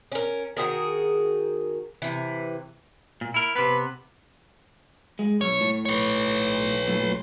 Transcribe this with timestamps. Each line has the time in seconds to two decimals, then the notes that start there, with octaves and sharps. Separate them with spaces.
0.12 C#4 A#4
0.57 D#3 F#4 G#4 A#4
2.02 C3 E3
3.21 A#2
3.34 E4 A#4
3.55 C3 B3 B4
5.19 G#3
5.41 B1 C#5
5.61 A2
5.85 B4 C#5
6.88 F#2 A#2 A3